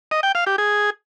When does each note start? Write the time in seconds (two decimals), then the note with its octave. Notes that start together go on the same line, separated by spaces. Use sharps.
0.11 D#5
0.23 G5
0.35 F5
0.47 G4
0.58 G#4